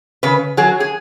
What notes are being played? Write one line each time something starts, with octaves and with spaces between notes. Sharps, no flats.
C#3 B4
F#3 G#4
G#4